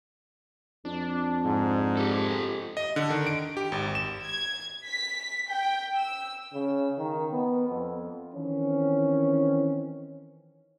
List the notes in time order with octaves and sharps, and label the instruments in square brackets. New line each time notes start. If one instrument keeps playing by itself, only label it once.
[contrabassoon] F2 [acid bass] D4
[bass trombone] G#2
[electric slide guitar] G4 A4
[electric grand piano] D#5
D3
D#3
D7
G4
G#1
E7
[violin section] G#6
B6
G5
E6
[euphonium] C#3
D#3
B3
F2
[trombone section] D#3 E3 C4 C#4